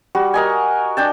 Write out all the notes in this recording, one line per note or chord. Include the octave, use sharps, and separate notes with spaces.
G3 F#4
A#4 D#5 G#5
D4 G5 A5